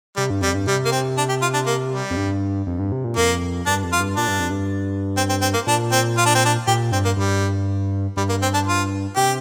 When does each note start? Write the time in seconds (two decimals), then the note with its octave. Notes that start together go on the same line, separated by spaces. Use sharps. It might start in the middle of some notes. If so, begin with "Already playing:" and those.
0.16 C3 G3
0.30 G2
0.42 F2 G3
0.55 G2
0.67 C3 G3
0.86 A#3
0.92 C4
1.18 D4
1.29 G4
1.42 F4
1.54 D4
1.67 A#3
1.92 G3
2.11 F2
2.17 G2
2.67 F2
2.79 G2
2.92 C3
3.04 A#2
3.17 F2 A#3
3.66 G2 D4
3.83 F2
3.93 F4
4.00 G2
4.16 A#2 D4
4.28 G2
4.39 F2
4.50 G2
5.17 C4
5.29 C4
5.42 C4
5.54 A#3
5.67 A#2 D4
5.92 C4
6.18 F4
6.26 D4
6.35 C4
6.45 D4
6.67 A#2 G4
6.92 G2 C4
7.05 A#3
7.17 G2 G3
8.17 G2 G3
8.29 A#3
8.42 C4
8.54 D4
8.67 F4
9.16 C3 G4